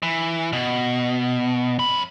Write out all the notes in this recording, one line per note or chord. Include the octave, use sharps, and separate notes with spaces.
E3
B2
F#2 B5